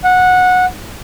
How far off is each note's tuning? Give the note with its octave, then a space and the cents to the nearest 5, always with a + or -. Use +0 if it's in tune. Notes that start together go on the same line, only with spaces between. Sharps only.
F#5 -15